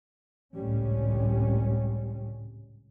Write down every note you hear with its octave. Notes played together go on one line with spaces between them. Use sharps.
G#1 C#2 A2 C3 G3 C#4